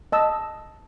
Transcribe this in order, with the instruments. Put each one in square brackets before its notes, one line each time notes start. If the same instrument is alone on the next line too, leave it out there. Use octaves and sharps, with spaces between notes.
[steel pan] D#5 A5 E6